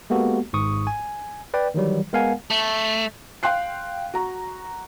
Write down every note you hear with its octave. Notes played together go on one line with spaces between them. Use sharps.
G#3 A#3 B3 F#4 G4 A4
G#1 G#2 C#6 D#6
G#5
B4 D5 G5
D#3 E3 F#3 G3
G#3 B3 A#4 F5 F#5 G#5
A3
F5 G5 C6 F#6 C7
F#4 A#5